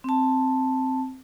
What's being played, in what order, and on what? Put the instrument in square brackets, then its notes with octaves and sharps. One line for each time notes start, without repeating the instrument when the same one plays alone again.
[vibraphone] C4 A5